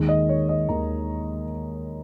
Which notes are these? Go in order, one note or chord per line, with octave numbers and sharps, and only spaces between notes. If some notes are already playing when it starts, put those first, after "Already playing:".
Already playing: D#2 D#3 G#3
D#5
C#5
D#5
D#2 D#3 G#3 A#5